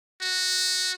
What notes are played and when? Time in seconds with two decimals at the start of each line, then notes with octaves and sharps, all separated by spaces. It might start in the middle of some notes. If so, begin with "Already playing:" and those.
0.21 F#4